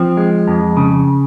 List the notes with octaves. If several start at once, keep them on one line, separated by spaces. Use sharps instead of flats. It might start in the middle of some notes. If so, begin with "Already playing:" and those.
Already playing: F3 C4
G#3
F2
C#3